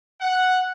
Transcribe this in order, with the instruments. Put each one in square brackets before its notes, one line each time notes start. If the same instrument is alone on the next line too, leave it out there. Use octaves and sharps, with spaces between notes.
[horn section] F#5